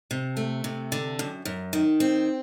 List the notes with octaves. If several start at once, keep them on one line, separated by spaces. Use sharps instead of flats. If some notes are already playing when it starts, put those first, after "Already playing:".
C3
A3
C3
D3
F#2
F#2
D#3
C4